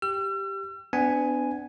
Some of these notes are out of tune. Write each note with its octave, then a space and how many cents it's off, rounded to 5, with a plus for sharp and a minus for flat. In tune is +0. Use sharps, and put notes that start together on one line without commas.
G4 +0 E6 +45
B3 +40 D4 +0 G#5 +0